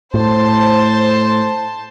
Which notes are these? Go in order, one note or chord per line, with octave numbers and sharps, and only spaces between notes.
A2 C5 A5